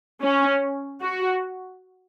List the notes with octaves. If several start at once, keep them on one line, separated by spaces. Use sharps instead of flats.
C#4
F#4